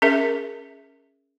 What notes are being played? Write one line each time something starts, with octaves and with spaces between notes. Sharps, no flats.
C#4 G#4 A#4 E5